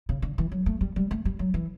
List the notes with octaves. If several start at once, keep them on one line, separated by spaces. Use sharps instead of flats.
C#3
D3
E3
F#3
A3
G3
G3
A3
G3
F#3
E3